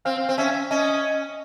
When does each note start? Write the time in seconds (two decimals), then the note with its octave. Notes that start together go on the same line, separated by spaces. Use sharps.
0.05 C4 F5
0.29 C4
0.38 C#4 E5
0.71 C#4 D#5